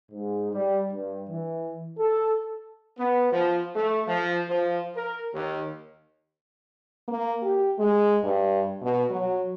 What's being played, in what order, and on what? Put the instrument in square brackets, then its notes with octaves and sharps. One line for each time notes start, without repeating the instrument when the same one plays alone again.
[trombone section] G#2
G3
G2
E3
A4
B3
F3
A3
F3
F3
A#4
D#2
[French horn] A#3
G4
G#3
G2
B2
F#3